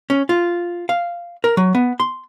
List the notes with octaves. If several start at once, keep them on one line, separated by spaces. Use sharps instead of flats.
C#4
F4
F5
A#4
F#3
B3
C6